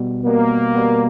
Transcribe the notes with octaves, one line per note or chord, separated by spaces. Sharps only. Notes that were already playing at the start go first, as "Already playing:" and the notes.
Already playing: B2 G3 B3
B2 G3 A#3 B3
B2 G3 B3